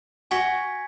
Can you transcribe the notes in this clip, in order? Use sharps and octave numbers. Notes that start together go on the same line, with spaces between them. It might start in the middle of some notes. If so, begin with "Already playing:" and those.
F#4 G#5 C#6 G#6 B6